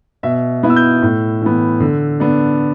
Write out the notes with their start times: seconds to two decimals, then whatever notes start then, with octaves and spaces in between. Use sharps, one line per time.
0.23 B2 E5
0.63 B3 E4
0.70 E6
0.76 G6
1.02 A2
1.42 E3 B3
1.80 D3
2.20 B3 D4